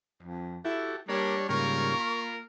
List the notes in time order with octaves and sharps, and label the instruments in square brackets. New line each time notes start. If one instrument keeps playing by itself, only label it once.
[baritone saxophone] F2
[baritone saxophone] E4 [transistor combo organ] F#4 G4 A4
[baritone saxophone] G3 [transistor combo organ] A#3 A#4 D5 [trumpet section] D4 C#5
[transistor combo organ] G#2 C#3 G3 [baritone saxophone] A#3 [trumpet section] F4 A#4 [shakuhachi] C#6
[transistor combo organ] B5